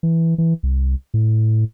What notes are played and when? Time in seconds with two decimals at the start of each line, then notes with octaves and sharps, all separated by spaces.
0.03 E3
0.38 E3
0.63 C2
1.14 A2